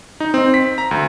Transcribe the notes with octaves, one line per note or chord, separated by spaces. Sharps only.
D#4
C4
B6
A#5
D2